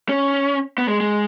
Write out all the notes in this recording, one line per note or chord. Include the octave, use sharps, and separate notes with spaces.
C#4
B3
G#3
G#3